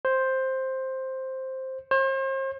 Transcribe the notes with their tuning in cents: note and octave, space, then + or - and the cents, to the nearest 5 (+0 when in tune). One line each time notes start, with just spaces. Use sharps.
C5 +5
C5 +40